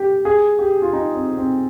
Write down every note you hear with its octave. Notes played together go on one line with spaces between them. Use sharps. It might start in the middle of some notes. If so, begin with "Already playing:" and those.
Already playing: G4
G#4
G4
F4
D#4
C4
C4